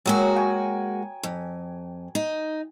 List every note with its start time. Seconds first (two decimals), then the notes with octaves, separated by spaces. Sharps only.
0.06 F#3 G#3 A#3 F#4 G#4 G5
0.36 G5 G#5 C#6
1.23 F2
2.15 D#4